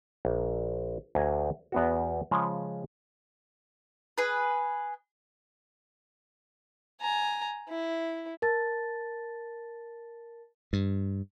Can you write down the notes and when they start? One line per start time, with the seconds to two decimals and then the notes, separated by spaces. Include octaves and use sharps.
0.25 A#1
1.15 D2 G#5 A#5
1.72 E2 B3 F#4
2.31 C#3 F3 G#3 C#4
4.18 G#4 B4
7.01 G#5 A#5
7.68 E4
8.42 A#4 A5 A6
10.73 G2